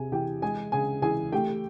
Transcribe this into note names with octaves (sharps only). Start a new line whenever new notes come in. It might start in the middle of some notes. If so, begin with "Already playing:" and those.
Already playing: C3 G#4 G#5
E3 G4 G5
G#3 G#4 G#5
C#3 G#4 G#5
E3 G#4 G#5
A3 G4 G5